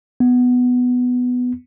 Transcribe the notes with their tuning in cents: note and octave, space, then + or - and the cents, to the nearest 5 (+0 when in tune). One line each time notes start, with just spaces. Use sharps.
B3 +5